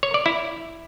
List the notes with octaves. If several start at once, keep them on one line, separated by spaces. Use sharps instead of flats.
C#5
D5
E4